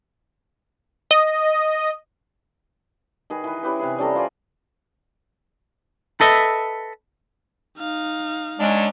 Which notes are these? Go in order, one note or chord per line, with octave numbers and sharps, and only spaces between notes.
D#5
D#3 G#4 B4
E3 B4
C#4 E4 G4 B4
C3 E3 G#4
G3 C#4 A4 A#5
F4 C5 D5 G#5
A4 B4 D#5 E5
D#4 F5
F#3 G#3 C#4 D4